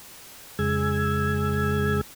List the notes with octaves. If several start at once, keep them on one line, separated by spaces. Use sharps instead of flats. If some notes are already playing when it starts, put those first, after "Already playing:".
F2 C#3 G#3 G#4 E6 G#6